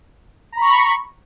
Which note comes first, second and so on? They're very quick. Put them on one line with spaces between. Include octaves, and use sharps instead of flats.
A#5 B5 C#6